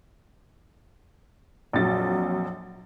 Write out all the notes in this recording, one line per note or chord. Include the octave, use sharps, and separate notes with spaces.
A#1 F2 F#3 A6